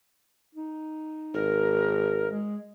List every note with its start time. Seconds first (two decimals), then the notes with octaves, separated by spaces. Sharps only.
0.55 D#4
1.34 G#1 A#4
2.24 G#3